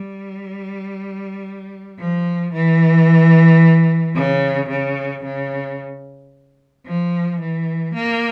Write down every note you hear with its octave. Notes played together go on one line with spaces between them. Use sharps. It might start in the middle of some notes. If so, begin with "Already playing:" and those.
Already playing: G3
F3
E3
C#3
C#3
C#3
F3
E3
A#3